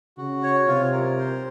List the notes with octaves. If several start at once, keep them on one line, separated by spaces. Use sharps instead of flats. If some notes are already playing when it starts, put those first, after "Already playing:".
C#3 F#4
C#5
C3 F4
A#4
C5